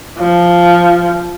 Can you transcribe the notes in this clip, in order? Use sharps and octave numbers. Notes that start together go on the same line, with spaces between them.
F3